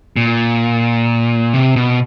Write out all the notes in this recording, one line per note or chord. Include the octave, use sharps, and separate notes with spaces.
A#2
C3
B2